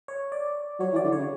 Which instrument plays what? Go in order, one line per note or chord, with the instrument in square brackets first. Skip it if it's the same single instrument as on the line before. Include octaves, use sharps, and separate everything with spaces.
[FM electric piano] C#5
D5
[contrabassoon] F#3 [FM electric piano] C#5
[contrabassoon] E3
[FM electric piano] D5
[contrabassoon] D3
[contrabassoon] C#3 [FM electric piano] C#5